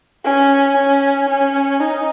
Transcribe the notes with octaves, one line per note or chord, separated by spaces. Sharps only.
C#4
C#4
C#4
D#4